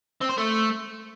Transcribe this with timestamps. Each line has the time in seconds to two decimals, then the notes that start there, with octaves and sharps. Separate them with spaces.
0.22 C4
0.30 C5
0.38 A3